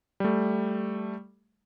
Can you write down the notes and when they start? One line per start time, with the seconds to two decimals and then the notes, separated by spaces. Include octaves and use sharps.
0.20 G3 A3